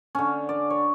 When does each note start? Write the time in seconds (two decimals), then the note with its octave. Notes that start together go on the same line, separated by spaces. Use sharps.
0.15 D3 C#4
0.49 D5
0.70 C#5